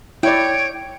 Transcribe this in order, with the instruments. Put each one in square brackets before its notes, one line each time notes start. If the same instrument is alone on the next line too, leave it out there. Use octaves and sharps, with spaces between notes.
[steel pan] E4 D5 [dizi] C#5 [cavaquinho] G5 [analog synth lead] D7